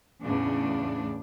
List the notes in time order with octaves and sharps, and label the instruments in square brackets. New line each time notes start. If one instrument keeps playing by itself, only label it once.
[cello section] E2 A2 C#3 D4